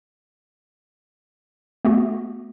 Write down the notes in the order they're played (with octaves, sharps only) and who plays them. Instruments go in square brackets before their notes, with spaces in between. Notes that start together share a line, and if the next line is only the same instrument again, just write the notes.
[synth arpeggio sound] A3 B3 F#4